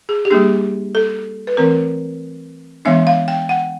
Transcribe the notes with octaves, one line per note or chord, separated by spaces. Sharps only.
G#4
G4
G3 A#3 D4 G#4
A4
B4
E3 A3 C4 A#4
E3 G#3 B3 D4 E5
F5
G5
F#5